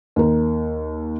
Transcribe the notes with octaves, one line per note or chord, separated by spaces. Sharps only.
D#2 A#4